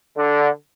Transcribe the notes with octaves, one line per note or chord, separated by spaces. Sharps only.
D3